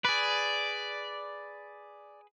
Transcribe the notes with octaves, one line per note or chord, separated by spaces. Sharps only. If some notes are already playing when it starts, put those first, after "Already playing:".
G#4 B4 D5